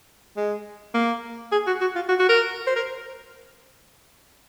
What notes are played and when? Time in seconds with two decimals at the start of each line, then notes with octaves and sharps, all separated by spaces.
0.37 G#3
0.94 A#3
1.52 G#4
1.67 F#4
1.81 F#4
1.96 F4
2.09 F#4
2.19 F#4
2.29 A#4
2.67 C5
2.76 A#4